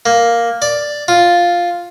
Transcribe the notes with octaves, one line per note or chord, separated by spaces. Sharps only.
A#3
D5
F4